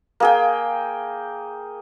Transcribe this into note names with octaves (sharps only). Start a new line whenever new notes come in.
A#3 G#4 G5